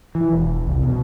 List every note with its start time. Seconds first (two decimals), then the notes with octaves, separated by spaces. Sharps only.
0.15 E3
0.32 E1
0.67 C2
0.83 B2